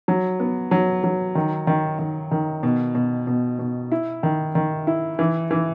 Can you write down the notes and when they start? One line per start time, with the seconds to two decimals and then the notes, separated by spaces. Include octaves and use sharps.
0.08 F#3
0.40 B3
0.71 F#3
1.04 F#3
1.35 D#3
1.67 D#3
1.99 D#3
2.31 D#3
2.63 B2
2.95 B2
3.27 B2
3.59 B2
3.92 E4
4.23 D#3
4.55 D#3
4.87 E4
5.19 E3
5.51 E3